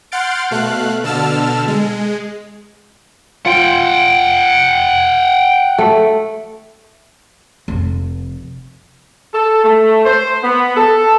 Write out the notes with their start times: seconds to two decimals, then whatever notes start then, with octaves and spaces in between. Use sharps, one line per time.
0.12 F#5 C6 F6 G6 A6 D7
0.51 B2 A3 F5 F#6
1.04 B2 D3 A5 E6 F6 A6
1.68 G#3
3.46 F4 F#5 G5
5.78 A3
7.68 F1 C3
9.32 A4
9.63 A3
10.05 C5
10.42 B3
10.76 A4